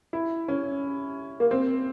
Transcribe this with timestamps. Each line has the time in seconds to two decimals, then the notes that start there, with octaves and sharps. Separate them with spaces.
0.13 E4
0.48 C#4
1.40 A#3
1.51 C4